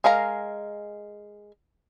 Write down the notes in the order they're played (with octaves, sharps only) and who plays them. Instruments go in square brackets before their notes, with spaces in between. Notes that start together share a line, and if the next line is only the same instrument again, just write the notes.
[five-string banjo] G#3 A#4 F5 A#5